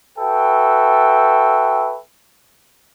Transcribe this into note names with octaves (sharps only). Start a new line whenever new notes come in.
F#4 A4 B4 E5 G5